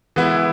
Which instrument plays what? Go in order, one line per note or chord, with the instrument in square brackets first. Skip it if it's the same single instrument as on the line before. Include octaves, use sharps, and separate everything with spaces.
[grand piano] E3 G#3 B3 E4